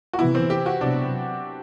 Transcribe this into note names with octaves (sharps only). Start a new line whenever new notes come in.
F#4
C3 E3 B3 E4
C4
G4
F#4
C3 F#3 B3 D4